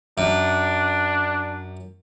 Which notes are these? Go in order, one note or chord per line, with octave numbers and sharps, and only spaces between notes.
F#2 D4